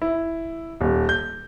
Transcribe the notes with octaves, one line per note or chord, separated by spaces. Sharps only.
E4
D#1
G6